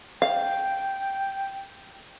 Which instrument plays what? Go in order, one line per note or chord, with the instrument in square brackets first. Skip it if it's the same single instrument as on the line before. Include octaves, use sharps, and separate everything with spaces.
[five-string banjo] F5 [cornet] G5